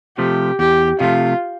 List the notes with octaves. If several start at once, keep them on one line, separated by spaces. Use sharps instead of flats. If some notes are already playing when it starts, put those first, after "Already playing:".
C3 F3 A3 G4
E2 G4
C3 F3 A3 F4